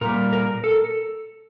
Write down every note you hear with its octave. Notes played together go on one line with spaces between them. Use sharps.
A#2 G3 A#4
A#4
A4